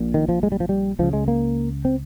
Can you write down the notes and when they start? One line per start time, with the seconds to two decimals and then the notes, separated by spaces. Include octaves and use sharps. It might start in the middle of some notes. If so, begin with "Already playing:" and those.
Already playing: A#1 A#2
0.14 D#3
0.29 F3
0.43 G#3
0.52 G3
0.60 F3
0.69 G3
0.99 C#2 C#3 F3
1.13 G#3
1.28 A#3
1.85 C4